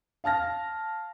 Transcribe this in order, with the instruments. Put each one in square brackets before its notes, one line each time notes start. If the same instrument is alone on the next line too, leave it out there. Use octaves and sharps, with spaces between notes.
[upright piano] F5 A5 F6 A#6